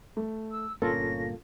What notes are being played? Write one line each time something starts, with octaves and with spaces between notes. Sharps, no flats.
A3
E6
G1 A#2 A#3 C#4 F4 A4 A#6